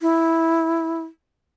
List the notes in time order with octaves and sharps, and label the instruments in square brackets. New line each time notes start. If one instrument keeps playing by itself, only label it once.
[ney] E4